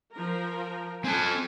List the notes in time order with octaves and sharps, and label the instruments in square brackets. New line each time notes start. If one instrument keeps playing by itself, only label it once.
[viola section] F3 A#4
[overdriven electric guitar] C4 A5 [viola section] A4 G#5